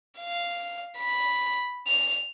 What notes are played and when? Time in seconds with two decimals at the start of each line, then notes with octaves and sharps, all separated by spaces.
0.19 F5
0.98 B5
1.87 F7